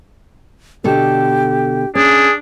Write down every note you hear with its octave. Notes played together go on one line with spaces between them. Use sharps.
B2 D3 G4 A4
C#4 D4 G#4